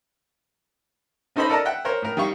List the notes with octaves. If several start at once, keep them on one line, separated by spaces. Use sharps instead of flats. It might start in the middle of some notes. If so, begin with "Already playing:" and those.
C#4 D#4 A4 C5 D#5 B5
A4 A#4 D5 D#5 A5 A#5
E5 F#5 G5 F#6
A#4 C5 C#5
A2 A#4
D#3 G3 F5 C#6